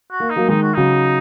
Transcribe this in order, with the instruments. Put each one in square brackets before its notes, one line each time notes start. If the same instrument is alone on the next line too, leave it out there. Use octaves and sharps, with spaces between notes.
[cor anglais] F#4
[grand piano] A#3
[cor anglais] D#4
[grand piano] F#3 A#3
[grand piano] D#3 G#3 [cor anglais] D#4
[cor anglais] F#4
[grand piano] C#3 F#3 [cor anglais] D#4